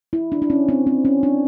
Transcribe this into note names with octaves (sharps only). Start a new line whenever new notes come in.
E4
D4
D4
C#4
C4
C4
C#4
D4